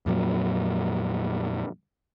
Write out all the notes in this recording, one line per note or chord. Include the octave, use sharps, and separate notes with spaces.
F2 A#2 F#3